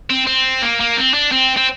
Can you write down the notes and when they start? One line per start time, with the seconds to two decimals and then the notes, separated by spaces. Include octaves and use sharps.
0.10 C4
0.27 C4
0.62 A#3
0.80 A#3
0.97 C4
1.14 D4
1.32 C4
1.57 C4